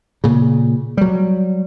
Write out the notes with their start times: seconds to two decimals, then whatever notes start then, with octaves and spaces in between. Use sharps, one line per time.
0.24 A#2 C#3
0.97 F#3 G3